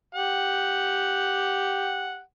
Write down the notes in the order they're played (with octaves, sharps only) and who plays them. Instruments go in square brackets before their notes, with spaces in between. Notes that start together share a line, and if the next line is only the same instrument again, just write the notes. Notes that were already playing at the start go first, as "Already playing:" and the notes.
[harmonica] G4 F#5